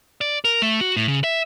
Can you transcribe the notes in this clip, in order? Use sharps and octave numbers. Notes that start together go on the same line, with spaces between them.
D5
A#4
A3
F#4
A2
C#3
E5